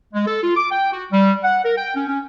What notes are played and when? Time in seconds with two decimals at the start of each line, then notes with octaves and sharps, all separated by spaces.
0.14 G#3
0.27 A4
0.43 F4
0.56 D6
0.71 G5
0.92 F#4
1.12 G3
1.43 F#5
1.64 A#4
1.77 G5
1.96 C#4
2.08 C#4